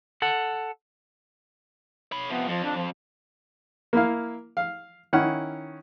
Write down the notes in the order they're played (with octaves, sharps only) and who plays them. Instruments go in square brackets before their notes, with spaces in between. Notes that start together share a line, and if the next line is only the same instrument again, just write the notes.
[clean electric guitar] A4 F#5
[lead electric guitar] C#5 B5
[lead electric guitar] C3 F3 [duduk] B3
[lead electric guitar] F2 [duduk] F3
[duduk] D4
F3
[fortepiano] A#3 E4 F5
F5
D#3 C#4 E4 F#5 F6